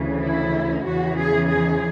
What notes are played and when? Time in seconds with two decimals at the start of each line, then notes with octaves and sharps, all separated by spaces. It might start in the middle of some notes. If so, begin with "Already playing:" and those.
Already playing: D2 C#3 E3
0.22 E4
0.84 E2 C#3 E3 F#4
1.17 G#4
1.47 G#4